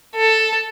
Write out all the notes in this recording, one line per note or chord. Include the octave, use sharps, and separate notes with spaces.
A4